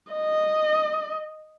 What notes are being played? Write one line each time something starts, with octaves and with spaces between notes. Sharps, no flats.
D#5